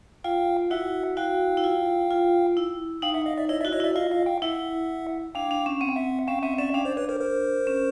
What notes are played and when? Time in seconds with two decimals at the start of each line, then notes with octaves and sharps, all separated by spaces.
0.24 F4 F5 G5
0.70 E4 F#4 E5 F#5
1.17 E4 F#4 F5 G5
1.57 E4
1.64 F4
2.11 F4
2.57 E4
3.02 D#4 F5 G5
3.14 E5 F#5
3.26 D#5 F5
3.38 D5 E5
3.49 E4 C#5 D#5
3.61 D5 E5
3.65 E4 F#4
3.72 C#5 D#5
3.80 E4 D5 E5
3.96 F4 D#5 F5
4.11 D#5 F5
4.26 F5 G5
4.42 E4 E5 F#5
5.35 D4 F5 G5
5.51 D4
5.66 C#4
5.81 C4 F#5
5.89 G5
5.96 E5 F#5
6.27 C#4 F5 G5
6.43 C4 E5 F#5
6.58 C#4 D5 E5
6.74 D4 F5 G5
6.85 C5 D5
6.97 B4 C#5
7.09 A#4 C5
7.20 A#4 C5
7.67 C#4